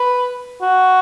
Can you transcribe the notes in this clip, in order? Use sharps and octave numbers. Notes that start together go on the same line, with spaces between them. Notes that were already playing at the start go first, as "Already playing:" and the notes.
Already playing: B4
F#4